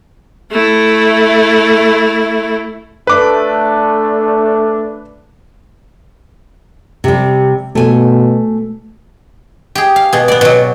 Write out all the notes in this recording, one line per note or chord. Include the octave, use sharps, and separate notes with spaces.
A3 E4
A3 D4 B4 D6
C3 G3
B2 A3 G#5
G4 G#4
F5
B2 G#4
B3 D5
B2 F#3